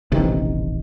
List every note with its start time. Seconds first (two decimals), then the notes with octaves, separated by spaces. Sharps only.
0.12 D#1 A1 C3 D#3